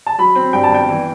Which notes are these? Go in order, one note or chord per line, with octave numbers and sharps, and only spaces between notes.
A5
F#3 B5
C4
G2 G5
A5
G1 G5
E3